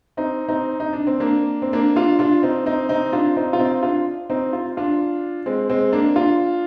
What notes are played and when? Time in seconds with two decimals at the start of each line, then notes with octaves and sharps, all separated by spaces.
0.17 C4 D#4
0.48 C4 D#4
0.80 D#4
0.93 D4
1.07 C4
1.20 A#3 D4
1.62 C4
1.73 A#3 D4
1.96 D4 F4
2.19 D4 F4
2.43 C4 D#4
2.66 C4 D#4
2.89 C4 D#4
3.13 D4 F4
3.36 C4 D#4
3.53 F4
3.60 C4 D#4
3.83 D4 F4
4.30 C4 D#4
4.53 F4
4.77 D4 F4
5.46 G#3 C4
5.70 G#3 C4
5.92 A#3 D4
6.16 D4 F4